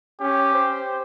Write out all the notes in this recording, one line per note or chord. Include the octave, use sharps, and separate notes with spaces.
C#4 G4
C5